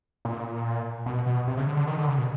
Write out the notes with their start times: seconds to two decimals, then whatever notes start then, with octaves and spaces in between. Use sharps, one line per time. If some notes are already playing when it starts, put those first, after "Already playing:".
0.25 A#2
1.06 B2
1.26 B2
1.47 C3
1.57 C#3
1.67 D3
1.77 D3
1.87 D#3
1.98 D3
2.08 C#3
2.18 B2